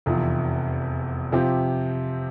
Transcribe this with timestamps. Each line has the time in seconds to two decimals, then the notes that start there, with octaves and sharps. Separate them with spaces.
0.06 F1 E2 C3 F3
1.32 C3 F3 C4 G4